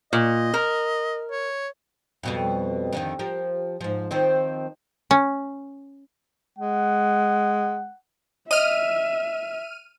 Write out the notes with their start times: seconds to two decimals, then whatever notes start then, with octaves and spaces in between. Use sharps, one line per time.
0.13 A#2 D#5
0.54 A#4
1.31 C#5
2.23 F2 B2 G3
2.93 F2 D3 D#3
3.19 F3 G4 A#4
3.81 G#2 F3
4.11 D#3 F3 C4
5.11 C#4
6.59 G#3 F#5
8.51 D#5 E5 F6 D#7